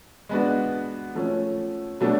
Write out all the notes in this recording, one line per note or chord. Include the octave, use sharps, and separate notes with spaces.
G#3 B3 D4 F#4
F3 A3 C#4
B2 F#3 A3 D4